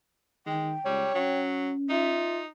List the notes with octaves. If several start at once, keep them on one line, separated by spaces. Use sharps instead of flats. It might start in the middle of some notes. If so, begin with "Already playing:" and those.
D#3 G#3 G5
C#2 G3 C#5
F#3 C#4
D#4 F4 E5